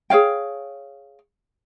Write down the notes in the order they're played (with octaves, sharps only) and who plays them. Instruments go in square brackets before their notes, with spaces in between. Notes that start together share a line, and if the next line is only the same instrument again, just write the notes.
[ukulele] G#4 C#5 F5 G5